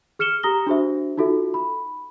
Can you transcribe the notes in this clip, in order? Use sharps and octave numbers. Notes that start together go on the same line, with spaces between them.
G#4 F6 C#7 E7 G7
G4 G#4 A#5 D#6 A#6 G7
D4 F#4 G#4 C5 E5
D#4 F4 F#4 A4 E5
B5